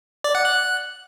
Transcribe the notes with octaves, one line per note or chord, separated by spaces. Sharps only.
D5
F#5
F#6